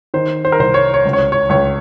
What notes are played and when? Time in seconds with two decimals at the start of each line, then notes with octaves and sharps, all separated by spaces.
0.14 D#3 C5
0.45 C5
0.52 A#4
0.59 C2 C5
0.74 C#5
0.94 C#5
1.05 C#2
1.13 C#5
1.32 C#5
1.49 C#2 C#5